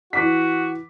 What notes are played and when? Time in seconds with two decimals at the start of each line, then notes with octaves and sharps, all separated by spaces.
0.13 E3 F#4 D6 B6